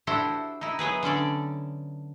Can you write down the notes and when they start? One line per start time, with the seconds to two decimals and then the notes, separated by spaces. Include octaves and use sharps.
0.07 D4 E4 F#4 G4 A4 C5
0.61 D#4 E4
0.79 F#3 B3 G#4 B4
1.03 D3 C#4 A4 D5